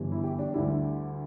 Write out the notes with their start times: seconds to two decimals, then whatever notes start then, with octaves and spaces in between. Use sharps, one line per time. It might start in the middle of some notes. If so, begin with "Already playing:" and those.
Already playing: G1 G2 E3 G3
0.12 E4
0.24 G4
0.39 D4
0.54 D2 D3 G3 E4